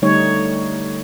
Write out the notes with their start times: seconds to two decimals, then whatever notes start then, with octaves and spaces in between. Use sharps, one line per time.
0.02 D3 G3 A3 D#4 C#5